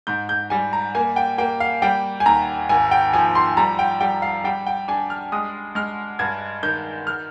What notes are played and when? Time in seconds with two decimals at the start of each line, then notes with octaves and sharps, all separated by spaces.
0.07 G#2 G6
0.29 G6
0.50 G3 G#5
0.73 A#5
0.95 A#3 G#5
1.16 G5
1.38 A#3 G5
1.60 F5
1.82 G3 G5
2.20 G#5
2.26 D#2 A#5
2.69 G#1 G#5
2.91 G5
3.13 F3 G#5
3.35 C6
3.57 G3 A#5
3.79 G5
4.00 G3 G5
4.22 F5
4.44 G3 G5
4.66 G5
4.88 D4 G#5
5.10 F6
5.32 G#3 D#6
5.75 G#3 F6
6.19 G2 G#6
6.63 D#3 G6
7.07 F6